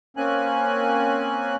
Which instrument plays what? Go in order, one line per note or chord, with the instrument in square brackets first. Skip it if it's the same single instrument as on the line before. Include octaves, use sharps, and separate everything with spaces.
[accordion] A#3 C4 C#4 G#5 F#6